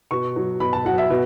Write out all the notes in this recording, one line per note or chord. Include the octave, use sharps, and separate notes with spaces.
B2 C#6
F#3
B2 B5
A5
F#3 F#5
E5
B2